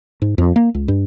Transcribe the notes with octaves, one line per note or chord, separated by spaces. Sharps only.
G#2
F2
A#3
C#2
G2